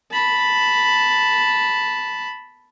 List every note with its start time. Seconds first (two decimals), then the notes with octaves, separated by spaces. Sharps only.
0.12 A5 B5